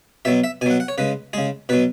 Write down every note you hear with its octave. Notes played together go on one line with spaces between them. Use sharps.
B2 F#3 E5
E5
B2 F#3 F#5 G#5
F#5
C#5
C#3 G#3 B4
C#3 G#3 G#4
B2 F#3 B4